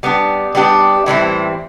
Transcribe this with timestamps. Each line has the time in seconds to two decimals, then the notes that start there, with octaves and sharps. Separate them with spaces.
0.03 G3 B3 D4 G4
0.55 G3 B3 D4 G4
1.06 A2 E3 G3 C4